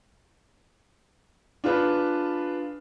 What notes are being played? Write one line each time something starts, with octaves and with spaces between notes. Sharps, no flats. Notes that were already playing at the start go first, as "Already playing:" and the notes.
D4 F4 G#4 B4